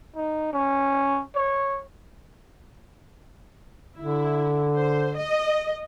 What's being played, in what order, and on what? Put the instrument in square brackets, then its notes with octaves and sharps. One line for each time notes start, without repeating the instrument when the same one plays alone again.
[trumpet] D#4
C#4
C#5
[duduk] D3 [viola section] E4
[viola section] C5
D#5